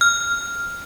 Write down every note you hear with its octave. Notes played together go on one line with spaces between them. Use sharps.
F6